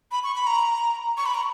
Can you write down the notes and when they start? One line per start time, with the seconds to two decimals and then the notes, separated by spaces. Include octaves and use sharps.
0.12 B5
0.24 C#6
0.36 B5
0.47 A#5
1.17 C#6
1.26 B5
1.35 A#5